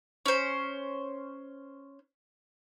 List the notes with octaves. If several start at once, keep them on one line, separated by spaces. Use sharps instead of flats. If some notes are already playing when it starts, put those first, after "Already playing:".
C#4 C5